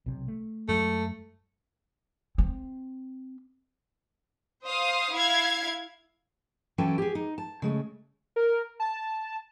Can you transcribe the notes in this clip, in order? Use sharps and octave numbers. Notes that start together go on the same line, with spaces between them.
B1 C3
A3
F#2 F#3 G#3 A3
C4
C5 F5 D#6
E4 F5 G#6
E3 F#3 C#4 A4 G5 A5
G4 G#4
D#4
A5
C#3 G#3 A3
A#4
A5